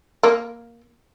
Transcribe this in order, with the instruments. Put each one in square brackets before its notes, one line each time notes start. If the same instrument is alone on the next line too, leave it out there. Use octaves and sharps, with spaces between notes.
[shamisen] A#3